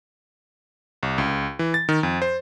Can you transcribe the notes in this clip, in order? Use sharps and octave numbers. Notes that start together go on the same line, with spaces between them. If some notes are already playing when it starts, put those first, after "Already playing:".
C2
C#2
E3
A6
D#3
F2
C5